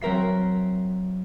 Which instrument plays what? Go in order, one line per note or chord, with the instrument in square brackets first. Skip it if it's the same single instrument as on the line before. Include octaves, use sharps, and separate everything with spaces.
[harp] F#3 C4 A#4 E5 C7